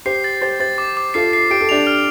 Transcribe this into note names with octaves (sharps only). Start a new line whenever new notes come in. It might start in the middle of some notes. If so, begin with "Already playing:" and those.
G4 C5 C7
A6
G4 C5 A6
G4 C5 A6
D6
D6
F4 A4 C7
C7
G4 D7
A4
D4 G4 F7
F6